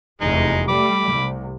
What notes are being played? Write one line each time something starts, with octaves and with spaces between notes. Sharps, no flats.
F1 E2 G#3 D#4
G3 A3 B5 D6
C2